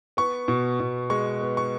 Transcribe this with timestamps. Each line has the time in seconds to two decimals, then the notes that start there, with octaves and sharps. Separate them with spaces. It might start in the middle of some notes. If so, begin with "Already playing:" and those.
0.17 B3 C#6
0.48 B2
0.80 B2
1.10 G#3 C#6
1.41 B3
1.57 C#6